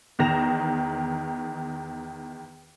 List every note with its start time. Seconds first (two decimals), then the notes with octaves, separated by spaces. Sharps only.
0.19 E2 D#3 A#6 E7 F7